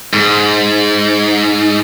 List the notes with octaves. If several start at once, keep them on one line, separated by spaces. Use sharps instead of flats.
G#2